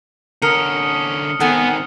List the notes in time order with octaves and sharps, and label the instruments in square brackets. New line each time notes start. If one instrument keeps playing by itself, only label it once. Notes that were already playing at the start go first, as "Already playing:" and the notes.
[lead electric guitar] D3 C#4 [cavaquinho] A#4 [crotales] D#6 F6 C#7
[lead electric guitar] D#3 C4 [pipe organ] B3 [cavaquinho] A4 F#5 G#5